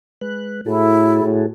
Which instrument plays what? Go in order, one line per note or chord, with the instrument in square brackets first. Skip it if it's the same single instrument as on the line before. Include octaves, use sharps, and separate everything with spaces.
[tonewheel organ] G#3 B4 F#6
[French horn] A2 [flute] E4 [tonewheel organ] F#4 G#4 A4
[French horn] A2